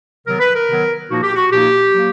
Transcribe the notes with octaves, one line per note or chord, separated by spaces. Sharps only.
C3 D#3 F#3 B3 A#4
B4
A#4
C3 D#3 F#3 B3
A#2 F3 A#3 D#4 F#4
G4
F#4
A#2 F3 A#3 D#4 G4
F#3 A#3